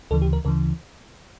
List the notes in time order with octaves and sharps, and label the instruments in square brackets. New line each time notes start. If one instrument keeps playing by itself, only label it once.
[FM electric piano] D2 C#3 E3 A4
G4
A#4
D2 C#3 E3 A#4